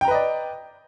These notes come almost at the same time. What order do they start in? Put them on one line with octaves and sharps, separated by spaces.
G5 A#5 B4 D#5 D5